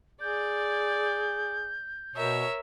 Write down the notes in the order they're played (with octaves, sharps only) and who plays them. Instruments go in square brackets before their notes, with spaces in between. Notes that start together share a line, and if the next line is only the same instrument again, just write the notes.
[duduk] G#4 [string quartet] D5 [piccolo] G6
[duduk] B2 [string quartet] A#4 C#5 E5